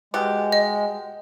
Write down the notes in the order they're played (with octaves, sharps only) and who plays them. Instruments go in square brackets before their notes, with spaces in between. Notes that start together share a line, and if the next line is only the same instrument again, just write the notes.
[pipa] B2 G4 [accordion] G#3
[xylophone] D#5